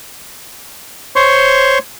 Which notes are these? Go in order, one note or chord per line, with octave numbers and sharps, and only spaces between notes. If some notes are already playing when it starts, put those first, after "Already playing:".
C5 C#5 C6 C#6